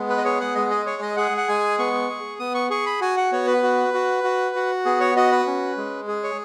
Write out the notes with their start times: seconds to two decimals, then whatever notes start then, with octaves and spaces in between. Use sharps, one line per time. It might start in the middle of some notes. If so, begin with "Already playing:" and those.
Already playing: G#3 B3
0.09 B4
0.18 D#5
0.25 G#4 C#5
0.40 F#5
0.55 G#3 D#5
0.71 D#5
0.86 G#4 C#5
1.02 D#5
1.16 G#4 F#5
1.37 F#5
1.48 G#3 G#5
1.79 B3 C#6
2.09 G#4
2.39 B3 D#6
2.55 C#6
2.70 G#4 C#6
2.86 B5
3.01 F#4 G#5
3.17 F#5
3.32 B3 C#5
3.47 B4
3.63 F#4
3.94 F#4
4.24 F#4
4.55 F#4
4.85 B3 G#4
5.00 C#5
5.16 F#4 D#5
5.31 B4
5.47 C#4
5.77 G#3
6.08 G#4
6.24 C#5